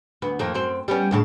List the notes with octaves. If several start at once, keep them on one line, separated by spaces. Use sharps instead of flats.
D2 B3
F2 D#3 A#3
F#2 C4
G3 B3 C#4
D2 A2 C#3